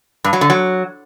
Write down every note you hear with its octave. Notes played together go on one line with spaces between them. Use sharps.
G2
F#3
D3
F#3